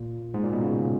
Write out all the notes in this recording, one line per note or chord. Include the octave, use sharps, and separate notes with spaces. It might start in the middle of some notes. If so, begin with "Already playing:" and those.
Already playing: A#2
G#2
A#2
B2
C#3